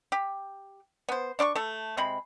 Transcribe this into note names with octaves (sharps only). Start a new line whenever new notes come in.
G4
B3 C5
D4 D5 C6 C#6
A3 A4
C3 G#3 B5